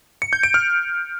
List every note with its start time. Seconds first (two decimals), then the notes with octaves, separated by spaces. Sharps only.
0.22 C#7
0.33 G6
0.43 D7
0.54 F6